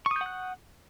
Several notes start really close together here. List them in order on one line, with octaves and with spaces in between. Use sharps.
C#6 D#6 G6 F#5 F#6